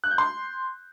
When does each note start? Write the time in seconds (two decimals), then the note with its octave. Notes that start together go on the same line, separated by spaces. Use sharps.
0.04 F#6
0.11 G6
0.18 C6